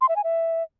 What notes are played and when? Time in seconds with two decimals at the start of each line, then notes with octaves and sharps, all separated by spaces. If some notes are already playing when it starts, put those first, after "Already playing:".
0.01 C6
0.09 E5
0.16 G#5
0.24 E5